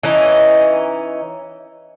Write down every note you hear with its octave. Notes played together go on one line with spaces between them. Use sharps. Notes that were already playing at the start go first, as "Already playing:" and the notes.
E3 C#4 D#4